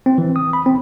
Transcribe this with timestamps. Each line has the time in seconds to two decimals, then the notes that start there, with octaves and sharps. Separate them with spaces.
0.06 C4
0.18 E3
0.36 D#6
0.53 B5
0.66 C4